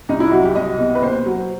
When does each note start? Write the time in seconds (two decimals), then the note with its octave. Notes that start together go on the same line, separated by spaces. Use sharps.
0.09 C2 D#4
0.20 E4
0.31 F#3 F#4
0.44 G4
0.55 C2 D#5
0.78 B2
0.95 B4
1.02 D#2 C5
1.26 F#3